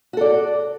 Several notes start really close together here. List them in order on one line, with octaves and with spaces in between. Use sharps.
F#4 A4 D5